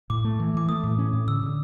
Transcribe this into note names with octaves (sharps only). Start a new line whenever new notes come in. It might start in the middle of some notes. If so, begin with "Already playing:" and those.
A2 D6
A3
E3
E3 D6
A3 D#6
A2
C#4
A2
D3 E6
D3